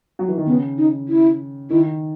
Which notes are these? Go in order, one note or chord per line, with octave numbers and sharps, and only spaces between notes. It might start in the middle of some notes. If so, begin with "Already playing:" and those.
F#3
E3
D#3
C#3 B3
D#4
E4
D#3 E4